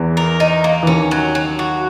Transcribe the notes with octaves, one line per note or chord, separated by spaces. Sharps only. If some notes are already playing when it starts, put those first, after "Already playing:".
Already playing: E2 E3
A#4
D#4
A#3
E3
D#2 D#3 C#4
F#3
F#3
F#4